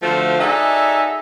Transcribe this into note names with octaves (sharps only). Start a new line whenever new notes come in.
D3 F3 A3 F4 F#4 C5
D#4 F#4 G#4 A4 D5 E5